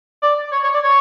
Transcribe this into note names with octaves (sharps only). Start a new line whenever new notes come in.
D5
C#5
C#5
D5
C#5